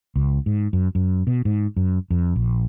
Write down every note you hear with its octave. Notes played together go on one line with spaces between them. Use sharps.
C#2
G#2
F#2
F#2
B2
G#2
F#2
F2
A#1